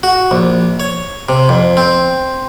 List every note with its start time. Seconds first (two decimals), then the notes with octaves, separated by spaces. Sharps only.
0.03 F#4
0.31 A#1
0.80 C#5
1.29 C3
1.49 F2
1.77 C4